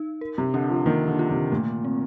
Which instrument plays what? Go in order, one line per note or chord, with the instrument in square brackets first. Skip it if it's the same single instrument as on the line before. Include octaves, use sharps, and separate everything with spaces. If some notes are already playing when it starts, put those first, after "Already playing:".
Already playing: [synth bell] D#4
A#4
[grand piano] C3
[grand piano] D3 [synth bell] D4
[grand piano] F3
[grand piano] D#3 [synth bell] A#3
[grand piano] D3
[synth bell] F4
[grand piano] C3
[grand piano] A#2 [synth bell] A3
[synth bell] C4